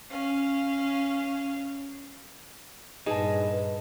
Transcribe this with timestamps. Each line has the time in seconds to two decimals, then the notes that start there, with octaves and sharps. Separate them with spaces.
0.10 C#4 F5
3.06 G2 A#2 D#4 G#4 B4 D#5 A5